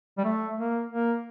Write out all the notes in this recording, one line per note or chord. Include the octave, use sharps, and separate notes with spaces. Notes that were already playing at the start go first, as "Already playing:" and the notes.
G3
A3
A#3
A#3